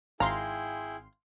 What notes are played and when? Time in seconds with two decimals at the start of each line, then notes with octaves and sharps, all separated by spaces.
0.20 G#1 E4 G#4 F5 G5 A#5 C6